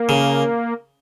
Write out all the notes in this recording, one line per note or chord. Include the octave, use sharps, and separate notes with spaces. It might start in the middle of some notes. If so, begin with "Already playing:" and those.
Already playing: A#3
C#3